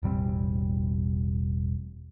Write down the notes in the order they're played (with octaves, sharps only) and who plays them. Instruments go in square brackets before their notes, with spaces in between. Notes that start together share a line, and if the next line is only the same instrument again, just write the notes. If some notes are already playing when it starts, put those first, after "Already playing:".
[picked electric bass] E1 A1 G3 C4